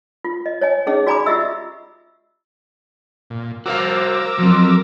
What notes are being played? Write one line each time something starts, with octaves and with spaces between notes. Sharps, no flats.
F4
D#5
C#5 D#5 G#5
C#4 D#4 G#4 C#5 D#5
F#4 D5 G#5 A#5 B5 D6
F4 G4 D#5 E5 E6
A#2
F#4 A#4 C5 F5 D6 E6
F3 F#3 C4